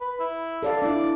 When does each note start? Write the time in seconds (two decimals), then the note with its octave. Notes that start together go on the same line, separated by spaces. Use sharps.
0.01 B4
0.20 E4
0.63 A4 D5 F5
0.82 D4 E4 D5